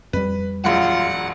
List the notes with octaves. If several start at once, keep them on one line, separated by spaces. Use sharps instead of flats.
F2 G3 B4
E1 A#1 F#2 F4 F#5